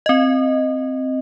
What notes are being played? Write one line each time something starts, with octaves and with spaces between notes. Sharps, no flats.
C4 D#5